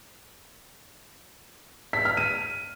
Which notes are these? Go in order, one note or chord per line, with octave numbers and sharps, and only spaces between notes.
B6
F6
D#7